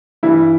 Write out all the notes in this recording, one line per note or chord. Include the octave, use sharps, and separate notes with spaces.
G2 E3 G3 E4